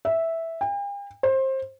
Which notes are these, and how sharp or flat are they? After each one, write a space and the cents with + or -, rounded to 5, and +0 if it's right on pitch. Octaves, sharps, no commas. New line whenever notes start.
E5 -5
G5 +45
C5 +25